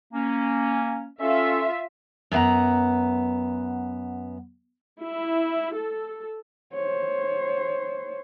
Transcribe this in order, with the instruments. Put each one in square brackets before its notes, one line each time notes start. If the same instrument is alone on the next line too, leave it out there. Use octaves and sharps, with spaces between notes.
[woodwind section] A#3 C#4
[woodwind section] C#4 A4 [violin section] F4 E5
[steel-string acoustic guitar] F#2 B3 F4 F#5 A#5
[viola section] E4
A4
[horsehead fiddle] C5 C#5